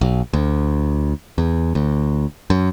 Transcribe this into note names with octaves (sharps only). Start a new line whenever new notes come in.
B1
D2
E2
D2
F#2